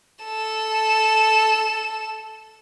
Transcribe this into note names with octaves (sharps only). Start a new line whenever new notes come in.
A4 E7